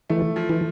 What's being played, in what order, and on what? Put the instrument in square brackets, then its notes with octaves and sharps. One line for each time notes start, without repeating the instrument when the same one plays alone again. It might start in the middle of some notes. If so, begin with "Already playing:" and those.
[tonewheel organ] E3 [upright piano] A3
[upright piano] F3
[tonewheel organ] E3